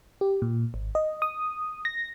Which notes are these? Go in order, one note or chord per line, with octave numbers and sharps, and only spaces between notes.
G4
A#2
G#1
D#5
D#6
A#6